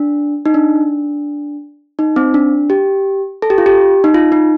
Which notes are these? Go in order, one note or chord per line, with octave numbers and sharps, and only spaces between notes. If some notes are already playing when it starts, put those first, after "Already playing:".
Already playing: D4
D#4
D4
D#4
C4
D4
G4
A4
G4
F4
G4
D#4
F4
D#4